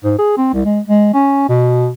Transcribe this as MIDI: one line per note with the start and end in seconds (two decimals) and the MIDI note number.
0.04 0.14 44
0.19 0.37 68
0.38 0.52 60
0.53 0.63 36
0.65 0.80 56
0.88 1.09 56
1.14 1.47 61
1.49 1.90 47